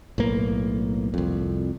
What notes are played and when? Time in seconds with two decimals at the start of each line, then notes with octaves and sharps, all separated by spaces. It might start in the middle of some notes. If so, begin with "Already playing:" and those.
0.18 B1 A2 A#3
1.14 C2 F2